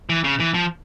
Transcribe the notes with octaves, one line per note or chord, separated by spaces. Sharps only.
E3
C#3
E3
F3